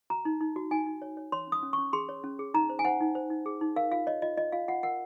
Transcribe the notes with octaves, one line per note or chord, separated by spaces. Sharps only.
F#4 A#5
D#4
D#4
F#4
D#4 G#5
D#4
C#5
C#5
C#5 C6
C#4 D#6
C#4
C#4 C#6
G#4 C6
C#5
C#4
G#4
D#4 A#5
C5
G#5
C5 F#5
D#4
C5
D#4
G#4
D#4
A#4 F5
F4 F5
C#5 D#5
F4 D#5
F4 D#5
F4 F5
F4 F#5
A#4 F#5